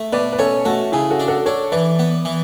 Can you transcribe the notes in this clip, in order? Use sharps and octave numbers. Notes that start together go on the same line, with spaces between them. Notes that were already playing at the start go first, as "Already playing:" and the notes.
Already playing: A3
B2 B4 D5
B4
C#4 A4 C#5
A3 F#4 A4
C#3 E4 G#4
F#4 A4
D4
F#4 A4
D4 A4 C#5
E3 B4 D5
B3
E3